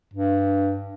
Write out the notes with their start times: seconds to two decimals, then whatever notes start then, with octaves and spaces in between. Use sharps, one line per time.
0.14 G2